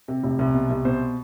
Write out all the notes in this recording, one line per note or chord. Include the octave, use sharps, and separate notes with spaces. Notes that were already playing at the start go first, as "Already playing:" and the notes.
C3
F1
C2
B2
C2
B2 C5